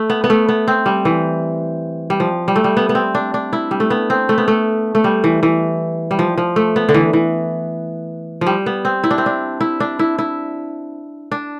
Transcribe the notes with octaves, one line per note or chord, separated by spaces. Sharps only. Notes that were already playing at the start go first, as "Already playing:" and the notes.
Already playing: A3
B3
B3
A3
B3
C4
G3
E3
G3
F3
G3
A3
G3
B3
B3
C4
D4
D4
E4
G3
A3
B3
C4
A3
B3
A3
A3
G3
E3
E3
G3
F3
F3
A3
B3
D3
E3
E3
F3
G3
B3
C4
E4
D4
C4
D4
E4
D4
E4
E4
D4